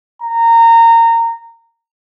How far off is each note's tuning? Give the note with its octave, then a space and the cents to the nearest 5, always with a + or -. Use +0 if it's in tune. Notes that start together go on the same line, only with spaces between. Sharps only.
A#5 -20